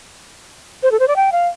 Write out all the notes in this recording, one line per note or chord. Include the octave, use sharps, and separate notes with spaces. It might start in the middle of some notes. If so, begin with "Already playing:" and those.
C5
A4
C5
D5
G5
F5